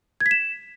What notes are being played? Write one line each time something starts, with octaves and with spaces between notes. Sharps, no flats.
G#6
B6
E7